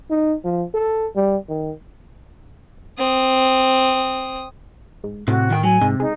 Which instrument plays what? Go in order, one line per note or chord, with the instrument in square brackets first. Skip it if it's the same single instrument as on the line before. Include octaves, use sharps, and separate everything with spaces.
[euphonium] D#4
F3
A4
G3
D#3
[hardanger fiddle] C4 D#6
[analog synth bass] G#2
[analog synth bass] A2 [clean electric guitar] C3 [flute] F#4
[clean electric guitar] D#3 G5
[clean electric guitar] F#3 [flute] G#5
[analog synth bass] G#2 [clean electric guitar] C3
[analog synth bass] G#3 [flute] D#4